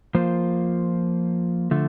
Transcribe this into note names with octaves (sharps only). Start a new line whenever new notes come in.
F3 A#3 F4 C5
D3 F3 A3